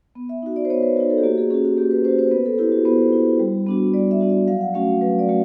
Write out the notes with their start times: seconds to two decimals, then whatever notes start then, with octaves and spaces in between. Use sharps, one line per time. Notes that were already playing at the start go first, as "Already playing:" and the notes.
0.15 B3
0.29 E5
0.42 D#4 F#4
0.56 D5
0.65 C5
0.70 B3 C#5
0.83 B4
0.97 D#4 F#4 A#4
1.10 A4
1.18 G4
1.23 A#3 F#4
1.38 G#4
1.50 C#4 G#4
1.54 F#4
1.65 F#4
1.77 A#3 G4
1.91 B4
2.04 C#4 C5
2.08 F#4
2.19 C5
2.31 B3 B4
2.46 A4
2.58 E4 G4
2.72 F#4
2.85 B3 C5
3.13 E4
3.39 G3
3.67 B3 D4 F#4
3.94 G3 D5
4.11 E5
4.21 B3 D4 F#4
4.30 E5
4.48 F#3 F5
4.61 F#5
4.74 A3 C#4 F#4 F5
4.88 F5
5.01 F#3 B4
5.19 D5
5.29 A3 C#4 F#4